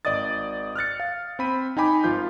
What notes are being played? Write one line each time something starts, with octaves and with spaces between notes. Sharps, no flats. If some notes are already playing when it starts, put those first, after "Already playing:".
G#1 D5 D#5 D#6 A6
F6 F#6 A6 C#7
F5
C4 B5 D#7
D#4 G5 G#5 B5 D6
G#1 F3 F4 G6